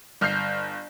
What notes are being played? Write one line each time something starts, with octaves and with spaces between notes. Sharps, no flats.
G1 F6 G6 C7